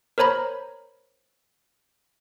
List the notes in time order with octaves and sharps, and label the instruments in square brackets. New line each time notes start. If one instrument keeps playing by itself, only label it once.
[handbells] A#4 C5 C#5 A#5 B5